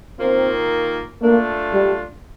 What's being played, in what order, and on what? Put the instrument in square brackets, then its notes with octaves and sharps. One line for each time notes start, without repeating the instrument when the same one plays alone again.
[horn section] D#3 A#3 F4 [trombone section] C4
[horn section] A3 D4 F4 [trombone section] A#3
[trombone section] G3